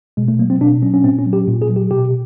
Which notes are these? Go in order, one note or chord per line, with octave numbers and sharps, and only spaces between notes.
B2 G#3
A3
F#3 A#3
C4
B2 D4
F#3 C#4
C#4
A#2 C4
C#4
F#3
G4
A#2
G#4
F#3
G4
B2 G4